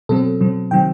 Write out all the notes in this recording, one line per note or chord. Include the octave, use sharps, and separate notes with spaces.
B2 F#3 C4 A4
B2 F#3 C4
C3 D#3 F#3 C4 G5